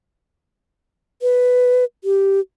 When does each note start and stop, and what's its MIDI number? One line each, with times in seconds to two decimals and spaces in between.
1.22 1.84 71
2.04 2.40 67